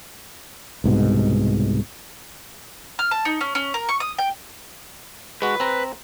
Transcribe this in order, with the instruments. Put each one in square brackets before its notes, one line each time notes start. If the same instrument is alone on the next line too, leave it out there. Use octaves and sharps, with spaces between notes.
[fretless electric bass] C2 G#2 B2
[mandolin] F6
A5
D#4
C#4
C#4
A#4
C#6
D#6
G5
[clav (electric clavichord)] G#3 F#4 [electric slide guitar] B4
[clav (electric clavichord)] C4 A#5